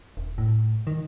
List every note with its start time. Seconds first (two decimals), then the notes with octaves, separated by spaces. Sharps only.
0.17 D#1
0.38 A2
0.87 D#3